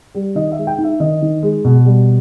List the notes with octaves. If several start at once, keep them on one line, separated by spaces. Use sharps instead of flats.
G3
D#3 D#5
E5
G#3
G5
D#4
E5
D#3 D#5
D#3
G#3
B2
G3